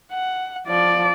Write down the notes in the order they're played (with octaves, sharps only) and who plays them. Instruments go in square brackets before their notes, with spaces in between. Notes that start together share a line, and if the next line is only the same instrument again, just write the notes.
[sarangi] F#5
[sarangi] F3 [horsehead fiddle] D5